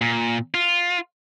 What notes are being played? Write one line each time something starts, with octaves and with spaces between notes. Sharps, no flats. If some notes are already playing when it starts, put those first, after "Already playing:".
A#2
F4